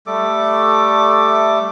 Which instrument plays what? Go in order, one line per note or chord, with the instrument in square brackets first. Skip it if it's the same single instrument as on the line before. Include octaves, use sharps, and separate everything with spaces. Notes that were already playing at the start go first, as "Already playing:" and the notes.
[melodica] G3 A3 A4 D6